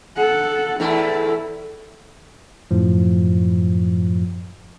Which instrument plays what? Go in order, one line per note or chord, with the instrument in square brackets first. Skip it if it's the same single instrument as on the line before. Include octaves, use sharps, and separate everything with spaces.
[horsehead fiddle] A4 F#5
[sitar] E2 A3 [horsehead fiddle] E4
[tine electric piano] F#2 A2 F3